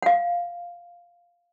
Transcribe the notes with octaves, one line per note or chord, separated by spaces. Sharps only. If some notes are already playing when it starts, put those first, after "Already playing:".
F5 F#5